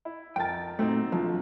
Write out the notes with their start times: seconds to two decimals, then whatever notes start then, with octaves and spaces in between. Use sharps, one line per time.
0.05 E4
0.36 F2 A#4 G5 A5 A6
0.79 A#2 F#3 A3 C4 D#4
1.12 B1 D3 F3